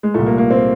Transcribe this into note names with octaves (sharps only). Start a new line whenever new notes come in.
G#3
C2 A#2 A3
A#3
A#3
C4